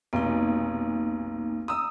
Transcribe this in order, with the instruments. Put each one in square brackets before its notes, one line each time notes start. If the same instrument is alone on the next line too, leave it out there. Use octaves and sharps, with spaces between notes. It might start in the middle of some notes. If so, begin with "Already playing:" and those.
[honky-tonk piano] F1 B1 [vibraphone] A#3 D#4
[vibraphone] A#5 [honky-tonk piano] D#6 E6